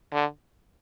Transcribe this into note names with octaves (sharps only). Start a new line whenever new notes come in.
D3